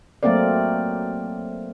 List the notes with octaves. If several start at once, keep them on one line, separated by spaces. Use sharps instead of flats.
F#3 A3 A#3 C4 A#4 D5